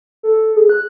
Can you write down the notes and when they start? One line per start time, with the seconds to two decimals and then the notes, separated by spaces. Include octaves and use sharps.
0.23 A4
0.56 G#4
0.69 F#6